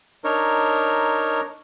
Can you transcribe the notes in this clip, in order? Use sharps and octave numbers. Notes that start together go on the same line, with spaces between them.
D4 D#4 A#4 C#5